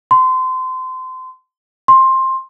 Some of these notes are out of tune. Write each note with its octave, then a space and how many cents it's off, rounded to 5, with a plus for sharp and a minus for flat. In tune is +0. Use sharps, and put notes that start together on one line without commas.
C6 -25
C6 +15